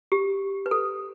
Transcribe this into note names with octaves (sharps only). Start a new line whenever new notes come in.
G4
B4
A4